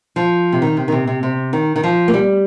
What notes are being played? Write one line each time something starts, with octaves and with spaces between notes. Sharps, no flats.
F3
C3
D#3
C3
D#3
C3
C3
C3
D#3
D#3
F3
A#3
G3